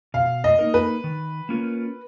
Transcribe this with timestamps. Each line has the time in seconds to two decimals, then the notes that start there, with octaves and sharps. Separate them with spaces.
0.14 B2 F5
0.44 D#5
0.59 A#3 D#4 A#4
0.74 B4
1.04 D#3
1.49 A#3 C#4 F4 A#4